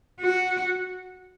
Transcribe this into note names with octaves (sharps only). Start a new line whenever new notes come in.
F#4